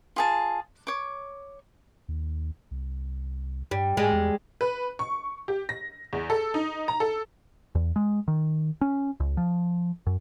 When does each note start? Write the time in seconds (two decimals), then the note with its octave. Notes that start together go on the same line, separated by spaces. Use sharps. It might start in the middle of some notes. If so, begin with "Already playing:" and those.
0.16 F4 G#4 A5
0.87 C#5 D6
2.09 D#2
2.71 C2
3.71 G2 G3
3.97 G#2 G3 G#3
4.12 E2
4.61 B4
4.99 C#6
5.48 G4
5.69 A#6
6.13 E2
6.30 A4
6.54 D#4
6.88 A#5
7.00 A4
7.75 E2
7.96 G#3
8.28 D#3
8.81 C#4
9.20 C#2
9.37 F3
10.07 F#2